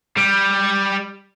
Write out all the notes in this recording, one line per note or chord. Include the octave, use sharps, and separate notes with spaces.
G3